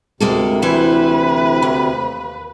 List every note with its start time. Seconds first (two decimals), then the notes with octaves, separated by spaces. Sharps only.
0.20 D2 C3 G#3 A#3 A4
0.62 E3 E4 B4 C5
1.62 D#2